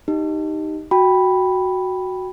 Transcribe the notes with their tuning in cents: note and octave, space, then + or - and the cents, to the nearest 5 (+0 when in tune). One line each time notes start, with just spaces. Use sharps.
D#4 +0 G4 +0
F#4 +0 G5 +0 B5 +0